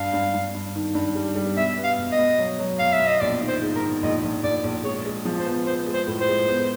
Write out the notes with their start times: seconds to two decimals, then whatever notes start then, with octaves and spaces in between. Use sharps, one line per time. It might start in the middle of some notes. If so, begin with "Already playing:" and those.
Already playing: G2 F5
0.13 G2
0.34 G2
0.54 G2
0.75 D#3
0.95 G2
1.15 G3
1.36 G3
1.56 B2 E5
1.77 B3
1.84 F5
1.98 B2
2.12 D#5
2.18 B2
2.38 F#3
2.59 F#3
2.79 B2 F5
2.92 E5
3.00 B2
3.07 D#5
3.20 A#1 D5
3.41 D#3
3.48 C5
3.61 G#2
3.75 A#4
3.82 D#3
4.03 A#1 D#5
4.23 A#1
4.43 A#1 D5
4.64 A#1
4.84 G#3 C#5
5.05 G#3
5.25 F3
5.39 C5
5.45 B3
5.66 B3 C5
5.86 G#3
5.94 C5
6.07 A2
6.21 C5
6.28 G#3
6.48 B3